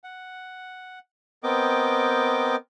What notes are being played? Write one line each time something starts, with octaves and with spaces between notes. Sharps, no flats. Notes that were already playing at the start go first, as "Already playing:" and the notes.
F#5
B3 C4 A#4 D#5 G5 D6